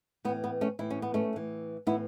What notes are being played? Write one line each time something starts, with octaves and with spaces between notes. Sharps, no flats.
A2 E3 B3
B3
A3 C#4
A2 E3 E4
C#4
B3
A3 C#4
A2 E3
A2 E3 B3 E4